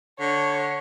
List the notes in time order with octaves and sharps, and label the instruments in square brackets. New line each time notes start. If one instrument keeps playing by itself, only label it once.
[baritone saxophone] D3 [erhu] C#5